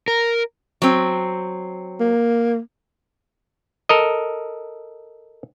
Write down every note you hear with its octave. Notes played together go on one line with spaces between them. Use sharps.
A#4
F#3 C4
A#3
A4 A#4 D#5